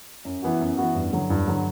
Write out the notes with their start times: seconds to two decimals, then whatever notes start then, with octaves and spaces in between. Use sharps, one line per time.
0.25 F#2
0.42 E3 B3 F#4
0.61 F#2
0.78 E3 B3 F#4
0.95 G2
1.13 D3 F#3
1.30 G2
1.48 D3 F#3